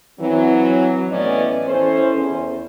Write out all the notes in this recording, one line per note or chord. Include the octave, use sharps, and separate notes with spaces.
E3 F#3 C4
A2 E3 B3 C#4 D5 D#5
E3 C#4 A4 C5
E2